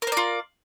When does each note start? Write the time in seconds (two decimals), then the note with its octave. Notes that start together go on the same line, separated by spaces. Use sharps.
0.02 A#4
0.07 C5
0.12 D5
0.17 F4